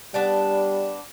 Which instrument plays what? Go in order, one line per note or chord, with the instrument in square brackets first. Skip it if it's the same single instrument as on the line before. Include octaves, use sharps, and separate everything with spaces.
[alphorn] G3 [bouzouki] B3 D4 D5